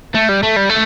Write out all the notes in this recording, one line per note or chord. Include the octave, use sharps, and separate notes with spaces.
A3
G3
A3
G3
A3